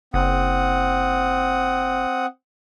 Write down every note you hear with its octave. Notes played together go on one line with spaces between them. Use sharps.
F#1 C4 F#5 D#6